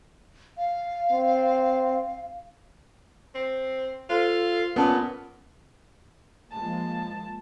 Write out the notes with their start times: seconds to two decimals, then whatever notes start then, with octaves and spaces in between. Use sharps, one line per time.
0.57 F5
1.11 C4
3.35 C4
4.10 F4 A4 C5
4.76 A#2 B3 C#4 A4 A5 D#6
6.52 F3 G#3 A#3 A5